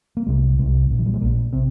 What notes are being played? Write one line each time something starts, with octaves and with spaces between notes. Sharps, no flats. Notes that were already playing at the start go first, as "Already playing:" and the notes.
A#3
C2 C3 G#3
C2 C3 G#3
A#1 A#2
F3
G3
G#3
A#1 A#2 A#3
C3 C4